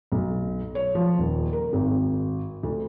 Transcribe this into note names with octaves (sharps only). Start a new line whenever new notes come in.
B1
C#5
F3
D#1
A#4
G#1
D2